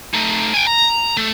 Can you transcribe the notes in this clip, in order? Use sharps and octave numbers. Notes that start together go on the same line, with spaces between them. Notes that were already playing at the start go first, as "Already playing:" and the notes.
A3 D#4
G5 G#5
A#5
A3